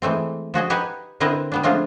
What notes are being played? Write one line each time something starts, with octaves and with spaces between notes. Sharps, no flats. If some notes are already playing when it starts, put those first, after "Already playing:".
E3 G#3 A3 C4
F3 F#4 G#4 D#5
D#4 G4 B4 F#5 G#5
D3 C4 E4 A#4 B4 D#5
G3 B3 D4
F3 G#3 A3 C4 D4 F4